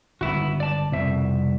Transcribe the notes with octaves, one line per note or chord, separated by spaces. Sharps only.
G1 G#2 C#3 B3 E4 F#4
D5 A5
C2 F2 B2 E5